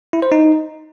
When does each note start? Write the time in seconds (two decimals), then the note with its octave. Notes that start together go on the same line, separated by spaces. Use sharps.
0.13 E4
0.22 C5
0.32 D#4